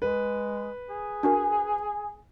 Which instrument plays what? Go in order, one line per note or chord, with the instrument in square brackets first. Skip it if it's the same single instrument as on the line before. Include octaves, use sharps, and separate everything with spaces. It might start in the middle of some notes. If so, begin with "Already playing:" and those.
[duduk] G#3 [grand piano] B4
[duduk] G#4
[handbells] D4 F#4 A#4 [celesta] G#5